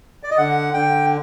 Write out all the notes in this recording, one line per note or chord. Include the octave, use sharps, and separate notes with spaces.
D5
D#5
D3 F#5
D3 G5